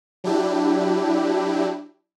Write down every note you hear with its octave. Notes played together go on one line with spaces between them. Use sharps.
F#3 D4 E4 G4